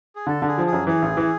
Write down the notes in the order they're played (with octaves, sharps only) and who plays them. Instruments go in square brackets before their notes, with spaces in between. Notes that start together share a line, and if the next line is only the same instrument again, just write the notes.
[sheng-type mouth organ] G#4
[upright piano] D3 [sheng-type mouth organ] A4
[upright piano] D3
[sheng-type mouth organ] G#4
[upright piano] F3
[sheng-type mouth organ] G#4
[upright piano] F#2
[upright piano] E3 [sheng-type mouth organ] G#4
[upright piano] A1
E3